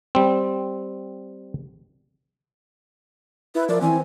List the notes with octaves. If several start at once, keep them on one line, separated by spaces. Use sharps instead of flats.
G3 C4
E4 B4
F3 A#4 D5
E3 C4 G#5